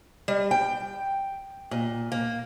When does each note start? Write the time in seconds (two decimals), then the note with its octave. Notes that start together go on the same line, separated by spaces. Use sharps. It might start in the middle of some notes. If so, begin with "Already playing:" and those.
0.28 G3
0.51 G5
1.71 A#2
2.12 A#3